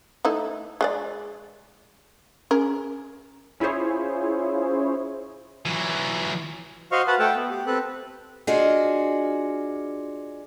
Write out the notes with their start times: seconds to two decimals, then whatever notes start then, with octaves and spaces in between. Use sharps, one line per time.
0.25 A3 D#4 E4
0.81 G#3 G#4 D5
2.51 C#4 G#4 A#4
3.60 C#4 E4 F4 G#4 C5 C#5
5.66 E3 F#3
6.92 F#4 C5 D#5 F5 C#6 F6
7.07 F#4 B4 F#5 A5 B5
7.19 A3 A4 F#5 G5 A5
7.35 B3
7.51 G4
7.67 C4 A4 B4 F#6
8.47 D4 F4 F#4 G#4 D#5